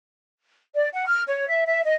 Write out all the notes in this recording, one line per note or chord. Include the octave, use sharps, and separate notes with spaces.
D5
F#5
F6
C#5
E5
E5
D#5